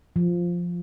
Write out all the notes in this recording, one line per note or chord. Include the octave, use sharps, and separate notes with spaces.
F3